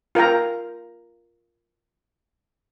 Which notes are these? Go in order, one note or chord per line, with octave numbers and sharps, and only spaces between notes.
F4 A#4 F5 G5 A#5